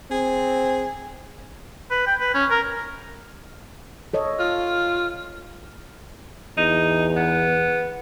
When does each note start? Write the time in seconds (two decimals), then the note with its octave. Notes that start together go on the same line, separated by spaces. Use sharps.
0.11 C4 G#4
1.91 B4
2.07 G5
2.20 B4
2.34 C#4
2.50 A#4
4.14 A4 C#5 D#5
4.39 F4
6.58 E2 D#4
7.16 B3